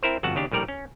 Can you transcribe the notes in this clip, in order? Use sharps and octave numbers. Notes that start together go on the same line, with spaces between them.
C4 E4 A#4 C5
G1 F2 F#4 F#5 A5
D#2 C#3 D4 G4
A#1 A2 G3 A#4 D5
C#4